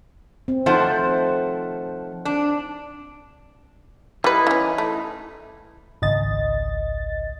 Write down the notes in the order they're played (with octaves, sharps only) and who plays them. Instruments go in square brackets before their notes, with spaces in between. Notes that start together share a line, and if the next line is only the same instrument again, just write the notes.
[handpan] C4
[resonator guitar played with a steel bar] F3 A3 C5 [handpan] D#4 F#5
[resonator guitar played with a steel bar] D4
[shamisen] G3 B4 [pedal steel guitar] D#4 E4
[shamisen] E3 C#4
A3
[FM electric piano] G#1 C#2 D#5 A6